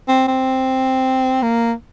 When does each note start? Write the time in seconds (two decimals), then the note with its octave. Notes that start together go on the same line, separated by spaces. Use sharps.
0.08 C4
0.28 C4
1.43 A#3